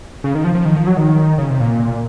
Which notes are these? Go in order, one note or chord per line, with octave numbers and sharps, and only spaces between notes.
C#3
D#3
F3
F3
D#3
F3
F#3
D#3
C#3
C3
A#2